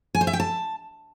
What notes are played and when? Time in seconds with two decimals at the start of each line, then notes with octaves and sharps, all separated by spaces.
0.15 G#5
0.21 C5
0.27 E5
0.33 G5
0.40 A5